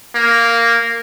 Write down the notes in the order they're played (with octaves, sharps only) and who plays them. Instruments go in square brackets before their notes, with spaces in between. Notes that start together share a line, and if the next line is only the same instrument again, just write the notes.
[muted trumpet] A#3